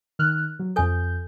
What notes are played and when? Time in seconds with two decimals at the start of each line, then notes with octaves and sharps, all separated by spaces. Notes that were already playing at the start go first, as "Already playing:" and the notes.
0.19 D#3 F6 F#6
0.59 F#3
0.76 F2 A4 G#5 G6